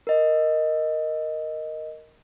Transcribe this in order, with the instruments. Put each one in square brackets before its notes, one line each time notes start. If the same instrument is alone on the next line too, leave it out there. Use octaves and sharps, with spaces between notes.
[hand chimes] A#4 D#5